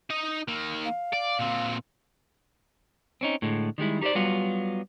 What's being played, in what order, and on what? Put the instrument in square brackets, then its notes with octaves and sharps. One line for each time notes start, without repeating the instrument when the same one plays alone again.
[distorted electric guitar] D#4 D#5
D#3 A#3
[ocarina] F5
[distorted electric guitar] D5
A#2 C4
[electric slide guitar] C4 C#4 D#4
A2 D3 G#3
D#3 G3 G#3 E4
D#4 G4 B4 C5 D5
F#3 G3 B3 F4 F#4